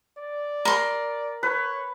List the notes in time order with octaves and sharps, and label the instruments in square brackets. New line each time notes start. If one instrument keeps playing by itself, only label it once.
[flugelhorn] D5
[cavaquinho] A#4 C6
[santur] B4 [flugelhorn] C#5